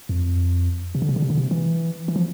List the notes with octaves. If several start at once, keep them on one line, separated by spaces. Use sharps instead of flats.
F2
C3
D3
C3
D3
C3
D3
C3
E3
E3
F3